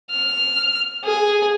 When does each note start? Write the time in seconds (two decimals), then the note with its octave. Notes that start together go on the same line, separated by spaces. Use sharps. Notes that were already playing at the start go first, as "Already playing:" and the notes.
0.10 F6
1.04 G#4